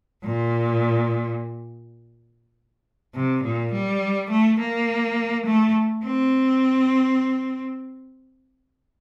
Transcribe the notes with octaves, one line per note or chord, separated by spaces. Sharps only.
A#2
C3
A#2
G3
A3
A#3
A3
C4